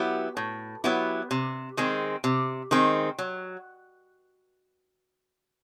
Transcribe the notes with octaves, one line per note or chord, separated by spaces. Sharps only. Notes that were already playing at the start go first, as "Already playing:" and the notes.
Already playing: F#3 B3 E4 G4
A2
F#3 B3 E4 G4
C3
D#3 G#3 C4
C3
D#3 G#3 C4
F#3